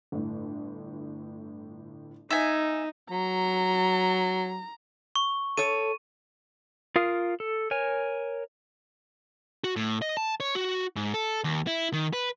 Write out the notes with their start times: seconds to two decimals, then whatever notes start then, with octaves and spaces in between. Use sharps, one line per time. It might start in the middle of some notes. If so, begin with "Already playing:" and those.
0.12 G1 A2
2.31 D#4 E5 G#5
3.11 F#3 A#5
5.16 C#6
5.57 A4 C#5 D#7
6.96 F4 A#4 F5 D#6
7.40 A4
7.71 A#4 C#5 G#5
9.64 F#4
9.76 A2
10.02 D#5
10.17 A5
10.40 C#5
10.55 F#4
10.96 G#2
11.14 A4
11.44 D#2
11.67 E4
11.93 D#3
12.13 B4